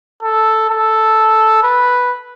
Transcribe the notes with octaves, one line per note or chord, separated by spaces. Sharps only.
A4
A4
B4